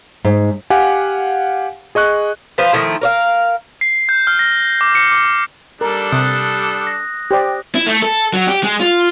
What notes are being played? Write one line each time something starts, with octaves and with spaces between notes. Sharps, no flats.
G#2
G4 F5 F#5 G#5
G#4 D#5 C#6 F#6
F3 B4 C5 F5
D#3 F3 A3 E4
A#4 D5 F5
C7
G6
F6
A#6
D6
C#7
D6
G3 D4 A4 A#4
C3 D#6 F#6
A#6
G4 C5 D5
E4
A3
A4
F#3
G4
G#3
F4